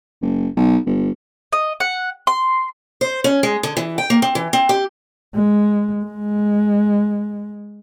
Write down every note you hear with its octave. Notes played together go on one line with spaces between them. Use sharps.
F#1
B1
G1
D#5
F#5
C6
C5
C#4
G#3
D3
E3
G5
A#3
C4
E3
C4
G4
G#3
G#3